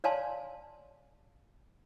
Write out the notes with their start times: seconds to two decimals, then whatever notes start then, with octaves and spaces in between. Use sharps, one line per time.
0.04 C#5 D5 F5 G#5 A5 C6